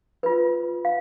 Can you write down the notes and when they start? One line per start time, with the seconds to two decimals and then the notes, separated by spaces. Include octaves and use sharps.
0.23 F4 B4
0.85 F5